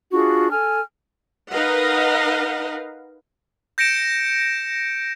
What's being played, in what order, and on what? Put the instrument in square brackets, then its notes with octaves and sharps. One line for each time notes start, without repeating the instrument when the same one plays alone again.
[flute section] D4 F4 F#4 G#4
A4 G#5 F6
[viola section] D#4 A#4 B4 D#5 F5 F#5
[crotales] G6 A#6 C#7 D7 E7